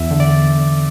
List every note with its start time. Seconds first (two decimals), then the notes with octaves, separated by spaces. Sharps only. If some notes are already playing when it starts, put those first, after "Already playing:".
Already playing: E2 E5
0.11 D3
0.20 D5